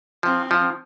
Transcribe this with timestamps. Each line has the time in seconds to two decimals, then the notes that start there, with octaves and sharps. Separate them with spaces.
0.23 F3 C4
0.51 F3